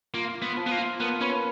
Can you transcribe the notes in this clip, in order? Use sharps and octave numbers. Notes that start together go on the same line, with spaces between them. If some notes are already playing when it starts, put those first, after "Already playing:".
A#3 F4
F4
B3
F3
B3
A#3
F4
A#3 B3
C#4 B4